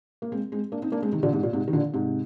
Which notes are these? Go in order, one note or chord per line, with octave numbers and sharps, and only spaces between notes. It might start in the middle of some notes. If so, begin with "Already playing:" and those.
A#3
G#3 C4
G#3 C4
A#3 D4
C4 D#4
A#3 D4
G#3 C4
C3 D#3
A#2 D3
G#2 C3
A#2
G#2 C3
D#3
A#2 D3
G#2 C3